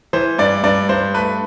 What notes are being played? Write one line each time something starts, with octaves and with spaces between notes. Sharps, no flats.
E3 C5
G2 D5
G2 D5
G2 C5
A3 B4